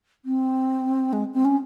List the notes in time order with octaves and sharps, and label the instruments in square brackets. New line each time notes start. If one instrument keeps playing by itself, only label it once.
[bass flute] C4
G#3
C4
C#4